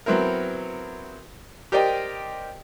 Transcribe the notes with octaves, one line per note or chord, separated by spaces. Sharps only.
F#3 B3 C4 E4 A#4
G4 A#4 C5 D5 D#5 G5